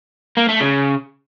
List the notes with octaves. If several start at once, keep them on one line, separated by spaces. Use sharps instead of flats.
A#3
A3
C#3